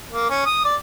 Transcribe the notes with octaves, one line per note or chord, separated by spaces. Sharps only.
A#3
C#4
D#6
D5